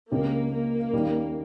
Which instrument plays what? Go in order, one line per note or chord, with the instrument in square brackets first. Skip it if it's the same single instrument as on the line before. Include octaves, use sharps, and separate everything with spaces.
[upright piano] C#2 C#3 G#3 C#4 G4 [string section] A#3
[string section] A#3
[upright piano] D#2 D#3 G3 C#4